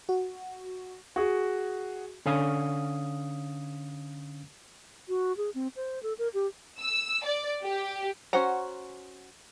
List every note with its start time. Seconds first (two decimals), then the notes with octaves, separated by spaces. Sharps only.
0.09 F#4
1.16 F#4 G#4
2.26 D3 C#4 F5 D#6
5.09 F#4
5.37 G#4
5.55 C4
5.76 C5
6.03 A4
6.18 A#4
6.34 G4
6.80 E6
7.24 D5
7.63 G4
8.33 C#4 F#4 C5 F#5 A#5